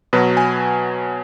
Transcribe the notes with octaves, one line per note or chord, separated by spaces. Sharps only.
B2 F#3 B4
G#5